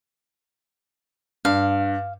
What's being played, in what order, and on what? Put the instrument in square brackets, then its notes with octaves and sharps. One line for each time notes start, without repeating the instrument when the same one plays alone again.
[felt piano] G2 [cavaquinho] F5